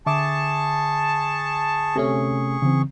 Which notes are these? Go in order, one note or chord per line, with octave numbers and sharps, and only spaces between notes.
D3 G#4 E5 A5 C#6 D6
C3 A3 C#4
C#3 E3 C4